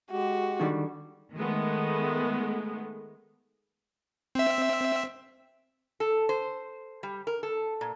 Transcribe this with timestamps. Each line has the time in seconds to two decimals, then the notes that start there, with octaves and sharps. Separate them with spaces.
0.11 G#3 F#4 G4
0.60 D3 D#3 G3
1.37 D#3 G#3 A3 B3
4.35 C4 E5
6.00 A4
6.29 C5
7.03 G3
7.27 A#4
7.43 A4
7.81 A#2